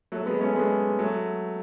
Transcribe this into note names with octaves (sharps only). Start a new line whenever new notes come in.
F#3 A3
G#3 B3
A3 C#4
G#3 B3
F#3 A3